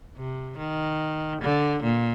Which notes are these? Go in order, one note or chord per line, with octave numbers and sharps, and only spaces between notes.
C3
D#3
D3
A#2